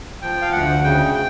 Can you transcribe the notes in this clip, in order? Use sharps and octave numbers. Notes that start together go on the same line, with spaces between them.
F3 G5
F5
D2 F#5
C#3 G5
G5